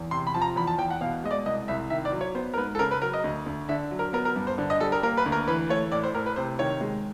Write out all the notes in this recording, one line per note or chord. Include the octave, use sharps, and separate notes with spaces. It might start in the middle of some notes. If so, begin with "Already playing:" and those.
Already playing: E2
C3 C6
B5
F3 A5
A#5
E2 B5
A5
E2 G5
F#5
B2 F5
G#3 D#5
D5
C2 D#5
C2 E5
D#3 E5
D5
F#3
C#5
B3 C5
A#4
G#2 B4
A4
C#3 A#4
B4
F#3 A#4
D#5
D2
D2
D3 E5
F#3
A#4
B3 A#4
A#4
G2
C5
D3
D#5
G3 A4
A#4
A#3 A#4
B4
D2
A#4
E3 B4
A3 C#5
A2 D5
C5
A2 A#4
B4
C3 C5
D#3 C#5
G#3